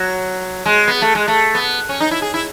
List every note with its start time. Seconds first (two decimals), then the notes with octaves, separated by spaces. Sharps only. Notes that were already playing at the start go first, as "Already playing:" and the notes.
Already playing: F#3
0.66 G#3
0.88 B3
1.02 A3
1.15 G#3
1.28 A3
1.55 B3
1.89 C#4
2.00 D#4
2.11 E4
2.22 G#4
2.34 E4